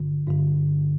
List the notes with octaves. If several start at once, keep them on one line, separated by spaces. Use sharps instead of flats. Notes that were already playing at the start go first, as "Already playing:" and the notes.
Already playing: G1 G2 D3
G1 G2 D3